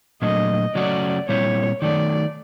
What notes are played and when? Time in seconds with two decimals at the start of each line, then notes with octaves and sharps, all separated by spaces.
0.22 A#2 F#3 A3 D4 D#5
0.75 C#3 F#3 A3 C#4 F#4 D5
1.28 A#2 G3 C4 E4 C#5
1.81 D#3 F#3 A3 D5